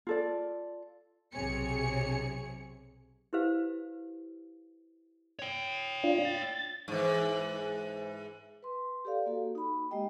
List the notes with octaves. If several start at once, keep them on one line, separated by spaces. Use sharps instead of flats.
F4 A4 D5
B1 C3 G#4 C#5 C#7
E4 G4 B4 C5 F5
C#5 G5
D4 F4
A6
G#2 E3
B4 C6
G4 A4 D5 F5
A#3 F#4 A4
D#4 B5
G#3 A#3 G4 D#5 G5